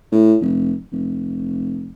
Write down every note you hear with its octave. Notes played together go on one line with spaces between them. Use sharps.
A2
F1
F1